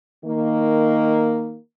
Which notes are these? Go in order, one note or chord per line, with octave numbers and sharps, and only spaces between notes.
D#3 A#3